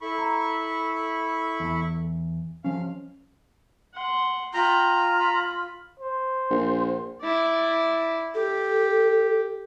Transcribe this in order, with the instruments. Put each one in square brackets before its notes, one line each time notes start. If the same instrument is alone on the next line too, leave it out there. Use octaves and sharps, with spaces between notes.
[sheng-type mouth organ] E4 B5 C#6 [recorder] A4
[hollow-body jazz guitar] A#5
E2
[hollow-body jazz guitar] F3 C#4 [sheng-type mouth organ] F5
[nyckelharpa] F#5 C6
[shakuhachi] F4 [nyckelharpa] G5 B5 [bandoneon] A#5
[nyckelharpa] B5
[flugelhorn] C5
[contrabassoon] A#1
[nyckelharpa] E4 D5
[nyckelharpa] G4 [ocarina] A4